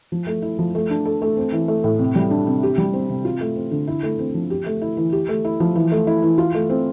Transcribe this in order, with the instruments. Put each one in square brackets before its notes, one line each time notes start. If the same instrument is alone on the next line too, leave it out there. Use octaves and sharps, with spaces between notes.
[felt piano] F3
A3
E4
F3
A3
D4
A4
A3
C4
E3
A3
A2
C3
G3
D4
C3
G4
G3
C4
C3
F4
A3
C4
D3
E4
A3
C4
F3
G4
A3
E4
E3
G4
A3
E4
F3
E3
A3
E4
E3
F4
A3
C4